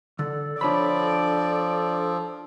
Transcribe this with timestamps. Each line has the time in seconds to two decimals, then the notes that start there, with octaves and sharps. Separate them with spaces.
0.19 D3 A4 D5
0.61 F3 D4 A4 C#5 D5 B5